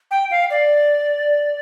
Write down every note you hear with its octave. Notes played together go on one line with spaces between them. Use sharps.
G5
F5
D5